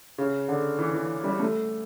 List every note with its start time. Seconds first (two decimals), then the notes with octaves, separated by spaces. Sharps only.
0.18 C#3
0.48 D3
0.79 E3
0.94 E3
1.24 G3
1.40 A3